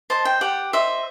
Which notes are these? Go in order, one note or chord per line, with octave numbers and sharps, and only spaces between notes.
C5 D#5 A5
G5
G4 F#5
C5 D#5 E5